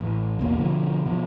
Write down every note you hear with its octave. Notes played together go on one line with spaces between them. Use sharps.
A1
A#1 E2 B2 A#3
B2 D3 F3
B2 F3